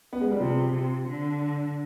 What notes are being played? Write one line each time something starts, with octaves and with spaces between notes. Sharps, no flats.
B3
G#3
G3
C3 F3
C3
D3